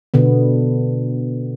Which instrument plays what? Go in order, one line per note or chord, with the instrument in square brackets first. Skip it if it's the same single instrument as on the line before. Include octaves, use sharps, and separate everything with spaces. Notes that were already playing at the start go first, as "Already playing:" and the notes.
[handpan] B2 D3 B3